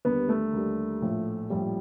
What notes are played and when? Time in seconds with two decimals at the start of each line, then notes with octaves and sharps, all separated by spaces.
0.05 D#2 D3 G3 B3
0.29 A3
0.53 D#2 D3 G3
1.02 A#1 A2 F3
1.50 A#1 A2 F3 G3